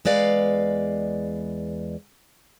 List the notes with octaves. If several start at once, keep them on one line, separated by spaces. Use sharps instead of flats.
E2 G#3 B4 D5 F5